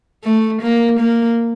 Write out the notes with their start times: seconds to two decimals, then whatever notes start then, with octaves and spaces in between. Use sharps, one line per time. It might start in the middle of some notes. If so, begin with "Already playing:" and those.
0.24 A3
0.62 A#3
1.00 A#3